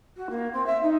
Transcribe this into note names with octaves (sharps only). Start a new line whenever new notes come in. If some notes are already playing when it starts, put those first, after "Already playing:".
F#4
A#3
C4
E5
D#4